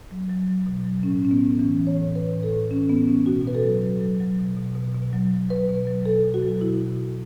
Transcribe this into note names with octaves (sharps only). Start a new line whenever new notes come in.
F#3
F#3
F#3
B2
F#3
A2 C#4
A2 C#4
B3
A2
E3 C#4
E3
C#5
A2
E3 B4
A2
A4
A2
E3 C#4
A2 B3
E3 C#4
B2 F#4
B2 B4
A4
F#3
F#3
F#3
F#3
B2
B2
B2
B2
F#3
F#3
F#3 B4
B2
F#3
B2 A4
B2
F#4
F#3
B2 E4
B2
B2